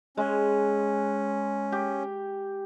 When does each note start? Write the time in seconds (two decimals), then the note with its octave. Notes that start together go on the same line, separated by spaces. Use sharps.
0.17 G#3 C#4
1.72 G4